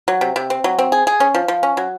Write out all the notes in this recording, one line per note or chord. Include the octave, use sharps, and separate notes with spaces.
F#3
C3
C3
C4
F#3
C4
G#4
G#4
C#4
F3
F3
C#4
F#3